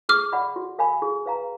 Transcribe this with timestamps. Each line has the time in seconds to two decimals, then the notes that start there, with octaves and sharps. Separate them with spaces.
0.09 G#4 D6 F6
0.32 D5 F#5 B5
0.56 F#4
0.78 A#4 F5 G#5 B5
1.02 G#4
1.26 B4 F5 A#5